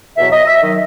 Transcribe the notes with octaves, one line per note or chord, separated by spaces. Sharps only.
E2 B2 F#3 E5
D#5
E5
D#3 F#3 D#5